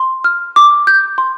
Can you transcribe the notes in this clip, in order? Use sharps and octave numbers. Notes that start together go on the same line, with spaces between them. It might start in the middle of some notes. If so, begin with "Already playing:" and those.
Already playing: C6
F6
D6
G6
C6